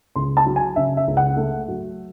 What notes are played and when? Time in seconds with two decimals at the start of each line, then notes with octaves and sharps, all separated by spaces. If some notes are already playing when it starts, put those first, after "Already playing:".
0.16 C#2 C6
0.37 A5
0.46 F#3
0.56 G#5
0.76 C#3 E5
0.97 E5
1.07 C#2
1.17 F#5
1.37 A3
1.68 F#3